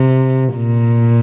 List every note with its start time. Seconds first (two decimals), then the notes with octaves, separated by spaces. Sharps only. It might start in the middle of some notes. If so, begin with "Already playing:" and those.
Already playing: C3
0.54 A#2